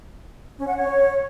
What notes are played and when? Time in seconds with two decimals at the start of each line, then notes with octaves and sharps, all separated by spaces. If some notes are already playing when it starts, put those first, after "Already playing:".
0.58 C#4
0.67 F#5
0.76 C#5